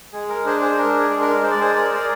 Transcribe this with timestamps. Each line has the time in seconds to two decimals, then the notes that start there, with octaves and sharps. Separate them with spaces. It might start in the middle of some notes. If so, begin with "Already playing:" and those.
0.13 G#3 G#4
0.29 A#4
0.45 D4 G#4 C5
0.61 G#4 C5
0.77 D4 A#4
0.99 G#4
1.09 G#3
1.21 A#4
1.41 G#3 C5
1.51 D5
1.60 G#4 C5
1.74 G#4 A#4 D5
1.95 D5